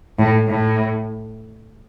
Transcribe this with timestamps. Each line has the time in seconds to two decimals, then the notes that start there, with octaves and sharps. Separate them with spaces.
0.19 A2
0.48 A2